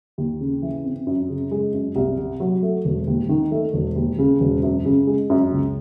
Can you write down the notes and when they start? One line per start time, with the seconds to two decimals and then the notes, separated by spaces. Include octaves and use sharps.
0.18 D#2
0.41 C#3
0.62 E3
0.85 C4
1.07 F#2
1.29 C#3
1.51 G#3
1.73 F#2
1.96 C2
2.18 C3
2.40 F#3
2.63 A3
2.85 E1
3.07 D#2
3.29 D#3
3.51 A3
3.73 E1
3.96 D#2
4.19 C#3
4.40 E1
4.63 F#2
4.85 C#3
5.07 G#3
5.30 F#2
5.52 C#2